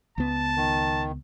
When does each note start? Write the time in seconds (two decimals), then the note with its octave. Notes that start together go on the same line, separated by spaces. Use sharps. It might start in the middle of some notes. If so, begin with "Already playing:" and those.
0.18 C#2 B3 A5
0.56 D#3